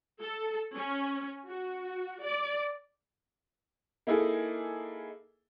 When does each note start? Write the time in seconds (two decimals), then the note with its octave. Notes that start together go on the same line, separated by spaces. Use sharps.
0.21 A4
0.75 C#4
1.48 F#4
2.22 D5
4.07 A#3 D#4 E4 G#4 A4